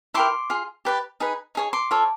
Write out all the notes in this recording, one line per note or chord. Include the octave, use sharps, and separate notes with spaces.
E4 G4 A#4 C6 D6
F4 G#4
G4 B4 D5
D#4 G#4 B4
D#4 G#4 C#5
C6 D6
F4 A4 C#5